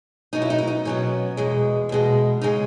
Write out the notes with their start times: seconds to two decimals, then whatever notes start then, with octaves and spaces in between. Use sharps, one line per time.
0.33 B2 F#3 B3 D#4
0.42 E4
0.50 D#4
0.58 E4
0.68 D#4
0.85 B2 F#3 B3 C#4
1.37 E2 B2 G#3
1.89 E2 B2 G#3
2.42 C#3 G#3 D#4